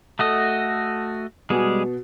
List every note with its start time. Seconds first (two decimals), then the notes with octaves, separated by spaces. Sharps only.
0.19 A3 F#4 A4 D#5
1.50 B2 G3 G#3 B3 F#4 G#4